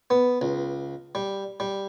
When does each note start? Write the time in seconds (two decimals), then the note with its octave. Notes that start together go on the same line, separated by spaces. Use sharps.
0.10 B3
0.41 C#2
1.15 G3
1.60 G3